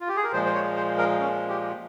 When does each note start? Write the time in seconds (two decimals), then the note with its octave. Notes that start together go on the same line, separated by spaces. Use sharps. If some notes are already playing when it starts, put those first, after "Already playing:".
0.01 F4
0.09 G4
0.17 G#4
0.24 A#4
0.32 A#2 F3 G#3 C5
0.46 C5
0.54 C#5
0.76 C5
0.98 A#4
1.20 C#4
1.49 G4